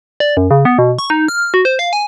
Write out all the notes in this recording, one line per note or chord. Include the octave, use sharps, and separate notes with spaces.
D5
F#2
C#3
B3
B2
C#6
D#4
F6
F#4
C5
F5
G#5